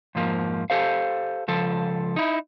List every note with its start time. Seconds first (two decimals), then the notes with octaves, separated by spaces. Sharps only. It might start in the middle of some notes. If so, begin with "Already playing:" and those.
0.15 F2 G#2 F3 A#3
0.70 G4 A4 C5 F5
1.48 C#2 F3 A4
2.16 D#4 E4